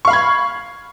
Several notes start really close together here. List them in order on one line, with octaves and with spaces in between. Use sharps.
C#6 F5 B5 G#6